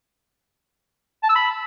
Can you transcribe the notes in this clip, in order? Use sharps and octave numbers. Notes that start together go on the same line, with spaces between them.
A5
E6
B5